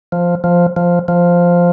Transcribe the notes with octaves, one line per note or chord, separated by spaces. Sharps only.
F3
F3
F3
F3